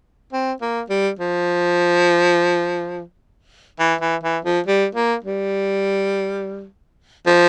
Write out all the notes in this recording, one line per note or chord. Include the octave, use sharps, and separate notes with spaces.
C4
A#3
G3
F3
E3
E3
E3
F3
G3
A#3
G3
F3